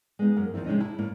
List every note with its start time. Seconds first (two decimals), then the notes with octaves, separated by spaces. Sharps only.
0.19 G#3 B3 D#4
0.36 F#2 A#3
0.54 D#2 D#3 F3 C4 E4
0.66 C3 G#3 C#4 D#4
0.80 E4 A5
0.98 A2 A#3